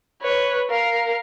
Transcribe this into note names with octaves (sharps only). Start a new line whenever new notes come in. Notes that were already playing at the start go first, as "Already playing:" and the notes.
B4 C#5
A#4 F5